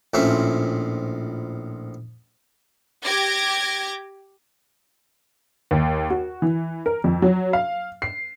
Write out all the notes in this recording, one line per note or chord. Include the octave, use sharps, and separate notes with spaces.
A#1 A2 C4 C#4 F4 E5
G4 D6 G#6 A#6
D#2
F#4
E3
A#4
F2
F#3
F5
C7